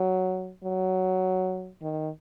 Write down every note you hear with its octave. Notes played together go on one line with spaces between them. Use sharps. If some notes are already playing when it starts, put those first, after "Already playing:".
Already playing: F#3
F#3
D#3